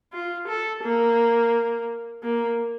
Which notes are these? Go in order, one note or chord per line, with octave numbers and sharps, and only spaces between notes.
F4
A4
A#3
A#3